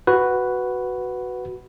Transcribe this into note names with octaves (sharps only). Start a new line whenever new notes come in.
F#4 B4